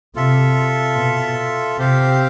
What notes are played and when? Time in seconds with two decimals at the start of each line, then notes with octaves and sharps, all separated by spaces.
0.15 C3 F4 A4 E5
0.96 B2
1.77 C3 C4 G4 C5 F5